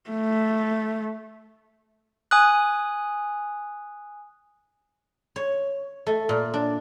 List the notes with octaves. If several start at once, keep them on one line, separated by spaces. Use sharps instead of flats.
A3
G#5 D#6 F#6
C#5
A3
A#2
D4